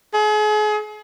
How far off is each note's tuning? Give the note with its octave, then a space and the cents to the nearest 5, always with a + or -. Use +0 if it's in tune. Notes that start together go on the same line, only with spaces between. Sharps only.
G#4 +35